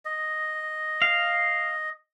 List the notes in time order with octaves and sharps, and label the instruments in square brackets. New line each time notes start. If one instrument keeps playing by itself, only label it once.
[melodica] D#5
[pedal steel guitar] F5